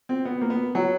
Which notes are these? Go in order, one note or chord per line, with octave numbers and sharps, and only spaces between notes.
C4
B3
A#3
B3
F#3